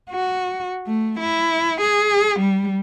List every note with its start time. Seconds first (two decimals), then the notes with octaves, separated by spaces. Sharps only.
0.11 F#4
0.87 A3
1.20 E4
1.81 G#4
2.40 G3